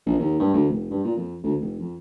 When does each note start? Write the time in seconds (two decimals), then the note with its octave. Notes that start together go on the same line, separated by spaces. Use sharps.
0.06 A#1
0.19 D#2
0.40 G2
0.54 D2
0.69 F1
0.91 G2
1.04 A#2
1.16 F2
1.43 D2
1.61 F1
1.80 F2